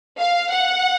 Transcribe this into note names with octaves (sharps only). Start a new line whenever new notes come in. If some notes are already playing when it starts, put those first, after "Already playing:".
F5
F#5